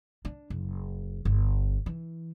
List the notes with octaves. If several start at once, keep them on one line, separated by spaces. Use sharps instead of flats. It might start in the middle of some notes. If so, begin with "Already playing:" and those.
D4
F#1
G1
E3